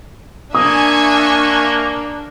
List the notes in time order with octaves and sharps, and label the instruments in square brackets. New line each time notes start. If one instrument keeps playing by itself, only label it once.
[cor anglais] A#3 [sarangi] D4 [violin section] E5 G#5 C#6 [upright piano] D#6